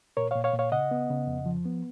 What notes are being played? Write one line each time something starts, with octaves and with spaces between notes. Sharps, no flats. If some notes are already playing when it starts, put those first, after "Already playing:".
A#2 A#4 C#5
A#2 C#5 F5
C#5 F5
A#2
C#5 F5
C#3 D#5 F#5
B3
C#3
F2
F3
B3